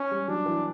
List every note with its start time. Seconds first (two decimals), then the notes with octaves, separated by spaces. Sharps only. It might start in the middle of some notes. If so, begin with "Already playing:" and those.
Already playing: C#4
0.11 G3
0.28 F#3 D4
0.46 E3